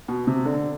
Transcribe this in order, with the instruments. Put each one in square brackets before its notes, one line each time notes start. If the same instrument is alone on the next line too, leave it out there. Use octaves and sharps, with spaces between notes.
[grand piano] B2
C3
D3